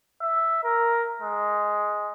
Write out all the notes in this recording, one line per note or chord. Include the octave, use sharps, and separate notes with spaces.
E5
A#4
G#3